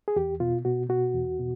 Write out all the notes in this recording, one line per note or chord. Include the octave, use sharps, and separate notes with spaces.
G#4
E2 G4
B2 F4
B2 F#4
B2 F#4
E2
B2